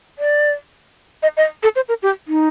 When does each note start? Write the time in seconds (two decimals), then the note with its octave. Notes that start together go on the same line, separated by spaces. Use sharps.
0.19 D5
1.23 D#5
1.37 D#5
1.63 A4
1.76 C5
1.89 A#4
2.03 G4
2.28 D#4